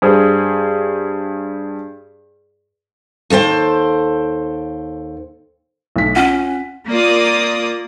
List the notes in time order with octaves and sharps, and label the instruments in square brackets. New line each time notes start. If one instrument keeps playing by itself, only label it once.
[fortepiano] G2 G#4 C5
[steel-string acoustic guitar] D#2 A4 C5 G5
[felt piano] B1 A3 B6
[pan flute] C#4 [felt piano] F4 F#5
[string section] A#3 F4 D5 D#6